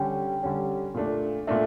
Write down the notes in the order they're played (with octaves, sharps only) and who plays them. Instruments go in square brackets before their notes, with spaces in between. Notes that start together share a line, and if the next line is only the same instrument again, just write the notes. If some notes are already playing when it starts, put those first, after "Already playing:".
Already playing: [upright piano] D3 G3 C#4 [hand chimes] G5
[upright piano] D3 G3 C#4
A#2 A3 D4
[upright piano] A#2 A3 D4 [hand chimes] E5